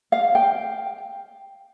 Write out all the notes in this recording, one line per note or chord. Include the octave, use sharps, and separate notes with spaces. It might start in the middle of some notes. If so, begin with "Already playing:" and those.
F5
G5